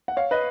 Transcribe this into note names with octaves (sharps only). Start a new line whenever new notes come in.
F#5
C#5 F5
B4 D#5